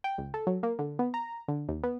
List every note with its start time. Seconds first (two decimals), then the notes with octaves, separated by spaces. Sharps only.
0.04 G5
0.18 C#2
0.34 A4
0.47 F#3
0.63 A#3
0.79 D3
0.99 B3
1.14 A#5
1.48 D3
1.68 D#2
1.84 B3